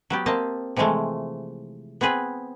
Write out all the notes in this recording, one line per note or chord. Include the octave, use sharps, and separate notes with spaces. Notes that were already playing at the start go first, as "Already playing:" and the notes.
F#3 B3 G4
A#3 C4 D#5 A5
C3 E3 F3 G#3 A3
B3 C4 G#4 B4